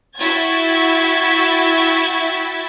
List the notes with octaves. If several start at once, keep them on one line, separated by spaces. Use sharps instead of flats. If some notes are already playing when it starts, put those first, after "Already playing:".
E4 F#4 E5 G5 G#6 A6